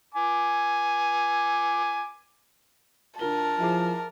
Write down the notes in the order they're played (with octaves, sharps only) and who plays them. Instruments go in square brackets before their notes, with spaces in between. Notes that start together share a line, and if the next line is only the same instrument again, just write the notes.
[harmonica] G#5 D6
[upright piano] D3 F4 G7 [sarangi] A#4 [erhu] A5
[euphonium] F3 [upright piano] E4 G#4 D6